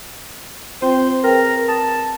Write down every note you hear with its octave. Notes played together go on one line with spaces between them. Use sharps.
C4 F4 C5 G5
G#4 A#4 B4 G5
A5 D#6